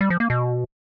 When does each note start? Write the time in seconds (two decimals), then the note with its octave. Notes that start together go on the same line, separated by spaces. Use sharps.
0.01 G3
0.10 F3
0.20 A#3
0.30 B2